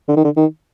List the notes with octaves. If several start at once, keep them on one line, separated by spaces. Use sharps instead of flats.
D3
D#3
D3
D#3